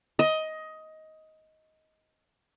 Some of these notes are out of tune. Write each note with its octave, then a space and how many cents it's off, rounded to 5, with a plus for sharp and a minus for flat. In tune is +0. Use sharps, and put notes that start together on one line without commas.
D#5 +15